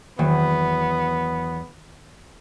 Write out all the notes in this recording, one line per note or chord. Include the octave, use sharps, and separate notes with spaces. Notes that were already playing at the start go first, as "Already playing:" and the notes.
E2 D#3 F#3 A#3 B3